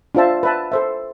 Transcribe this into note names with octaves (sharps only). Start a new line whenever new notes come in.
D4 F4 C5 E5 A5
B4 E5 A5
A4 C5 E5